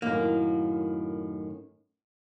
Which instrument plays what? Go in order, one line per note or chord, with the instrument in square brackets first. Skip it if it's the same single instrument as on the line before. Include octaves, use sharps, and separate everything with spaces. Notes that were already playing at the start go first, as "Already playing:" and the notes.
[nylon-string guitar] F#2 A2 D#3 [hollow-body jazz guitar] A#3